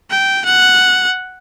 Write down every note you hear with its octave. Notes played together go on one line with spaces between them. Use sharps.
G5
F#5